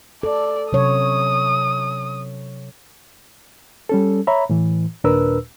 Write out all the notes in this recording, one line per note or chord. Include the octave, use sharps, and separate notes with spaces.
A4 D5
C3 F#3 C#5 D#6
G3 C#4 A4
C#5 E5 A#5 B5
A2 E3
D#2 A#2 D4 A#4 B4 E6